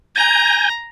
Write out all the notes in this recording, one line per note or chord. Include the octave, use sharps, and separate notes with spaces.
G#5 A#5 G6